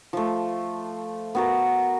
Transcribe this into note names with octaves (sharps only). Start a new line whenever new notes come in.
F3 A3
B3 F#4 A#4